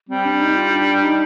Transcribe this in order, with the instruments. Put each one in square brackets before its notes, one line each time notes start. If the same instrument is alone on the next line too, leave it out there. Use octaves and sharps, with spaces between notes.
[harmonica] G3 [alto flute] C4
[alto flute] D4
D#4
F4
D4
D#4